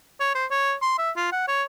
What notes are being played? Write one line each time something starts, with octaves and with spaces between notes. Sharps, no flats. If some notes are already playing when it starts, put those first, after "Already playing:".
C#5
C5
C#5
C6
E5
F4
F#5
C#5